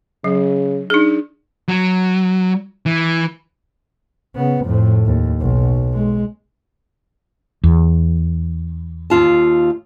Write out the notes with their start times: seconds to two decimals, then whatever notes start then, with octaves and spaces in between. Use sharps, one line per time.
0.24 C#3 F#3
0.90 D4 D#4 G#4
1.68 F#3
2.86 E3
4.36 C#3 B3
4.66 F2 A2
5.06 D#2
5.41 B1
5.94 G#3
7.64 E2
9.10 D#2 F4 A5